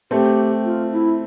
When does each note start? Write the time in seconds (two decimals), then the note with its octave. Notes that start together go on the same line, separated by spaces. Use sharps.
0.11 A3 C4 G4
0.65 F4
0.92 E4